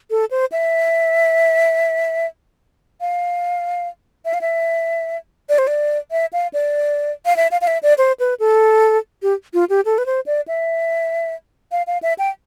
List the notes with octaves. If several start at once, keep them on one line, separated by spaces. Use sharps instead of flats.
A4
C5
E5
F5
E5
F5
E5
D5
C5
D5
E5
F5
D5
F5
E5
F5
F5
E5
D5
C5
B4
A4
G4
F4
G4
A4
B4
C5
D5
E5
F5
F5
E5
G5